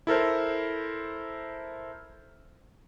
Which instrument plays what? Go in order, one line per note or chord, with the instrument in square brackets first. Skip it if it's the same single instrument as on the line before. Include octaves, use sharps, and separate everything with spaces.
[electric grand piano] E4 A4 A#4 C5